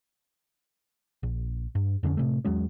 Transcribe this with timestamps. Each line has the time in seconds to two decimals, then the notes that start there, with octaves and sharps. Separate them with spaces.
1.23 A#1
1.75 G2
2.03 F2 D3 D#3 C#4
2.17 A2 C3 A3
2.45 E2 F#3 G#3 C#4